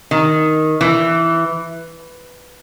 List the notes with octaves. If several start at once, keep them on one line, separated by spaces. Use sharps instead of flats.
D#3
E3